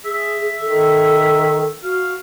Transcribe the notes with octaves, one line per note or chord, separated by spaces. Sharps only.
G#4 E5
D#3 A4
F#4 F5